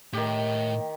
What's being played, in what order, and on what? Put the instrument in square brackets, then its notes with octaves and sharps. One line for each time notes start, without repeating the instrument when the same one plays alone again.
[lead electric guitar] A2 [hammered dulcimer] D#3 G4